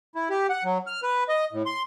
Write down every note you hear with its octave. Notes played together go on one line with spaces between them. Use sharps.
E4
G4
F#5
F#3
F6
B4
D#5
A2
C6